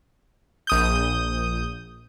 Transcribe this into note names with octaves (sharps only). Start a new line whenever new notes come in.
A#1 D#6 G6